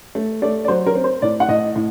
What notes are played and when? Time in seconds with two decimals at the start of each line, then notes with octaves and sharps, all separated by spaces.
0.15 A3
0.42 A3 D5
0.65 D5
0.68 F#3 C5
0.86 A#4
0.95 C4
1.04 C5
1.22 A2 D5
1.40 F#5
1.48 A2 D#5
1.76 A2